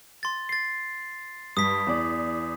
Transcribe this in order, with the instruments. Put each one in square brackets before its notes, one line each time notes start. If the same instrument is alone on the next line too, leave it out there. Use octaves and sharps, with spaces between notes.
[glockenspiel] C6 A6
A6 C7
[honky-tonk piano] G2 [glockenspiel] D#6 B6
[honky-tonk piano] E2 D5